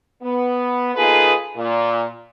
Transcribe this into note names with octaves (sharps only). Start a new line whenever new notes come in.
B3
A#3 D#4 F4 G#4 A4 B4
A#2